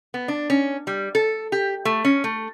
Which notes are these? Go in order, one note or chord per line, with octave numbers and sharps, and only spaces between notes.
B3
D4
C#4
G3
A4
G4
A3
C#4
A3